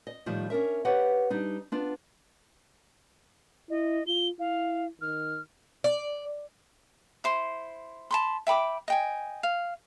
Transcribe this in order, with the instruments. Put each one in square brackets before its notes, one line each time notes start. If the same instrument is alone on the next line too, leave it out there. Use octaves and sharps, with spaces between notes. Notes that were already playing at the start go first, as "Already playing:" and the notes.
[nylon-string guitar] D#5
A2 D#3 F3 G3 F4
C#4 D4 A#4 E5
G4 B4 C#5 D#5 F#5
G3 D4 D#4
B3 D4 F4
[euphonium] E4 [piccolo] D#5
[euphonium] F4 [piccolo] G7
[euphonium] E4 [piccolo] F5
[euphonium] D#3 [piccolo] F6
[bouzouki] D5
[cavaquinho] E4 C5 C6
A5 B5 C6
E5 G5 B5 D6
D#5 G5 G#5
F5